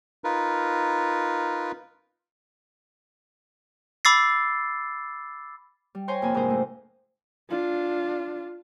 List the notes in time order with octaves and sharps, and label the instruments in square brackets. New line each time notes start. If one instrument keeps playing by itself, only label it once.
[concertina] D#4 F4 A#4 B4
[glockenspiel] B5 D6 E6 A6 C7
[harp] G3
C5 C#5 G5 G#5 A#5 C6
F2 C3 A#3 G#5 B5
G#2 C3 D4 A#4 C5
A3
[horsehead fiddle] D4 F4